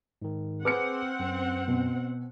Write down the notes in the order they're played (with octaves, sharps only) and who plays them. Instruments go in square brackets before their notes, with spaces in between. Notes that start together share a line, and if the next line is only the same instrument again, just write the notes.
[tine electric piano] G#2 D#3
[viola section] C4 F#5 [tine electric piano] G#4 D6 [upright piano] B4 F6 C#7
[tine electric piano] F#2
[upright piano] B2